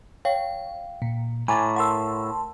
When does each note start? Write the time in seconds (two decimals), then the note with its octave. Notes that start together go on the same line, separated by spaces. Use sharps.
0.25 C#5 F5 G5
1.02 A#2
1.48 A2 G#5 A#5 D6 A6
1.76 A#4 F#5 A5 C6 E6